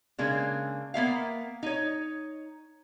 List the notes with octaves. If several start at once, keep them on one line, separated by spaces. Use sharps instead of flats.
C#3 G#3 A#3 D4
A#3 B3 E5 F5
D#4 C#5